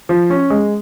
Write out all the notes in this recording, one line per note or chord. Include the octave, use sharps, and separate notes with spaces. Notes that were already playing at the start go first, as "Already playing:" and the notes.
F3
C#4
G#3